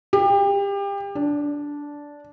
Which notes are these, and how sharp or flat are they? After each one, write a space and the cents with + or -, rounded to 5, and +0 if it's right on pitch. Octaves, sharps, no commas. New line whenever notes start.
G4 +30
D4 -10